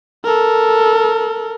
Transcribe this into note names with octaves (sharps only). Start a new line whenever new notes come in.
A4 A#4